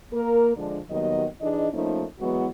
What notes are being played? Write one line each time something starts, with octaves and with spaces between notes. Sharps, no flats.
A#3 A#4
D3 F3 G#3 D4
D#2 D#3 F#3 G3 B3 D#5
E3 D4 D#4 G#4 D#5
F3 A3 A#3 C#4 D#4
E3 F#3 G#3 B3 E4 F#4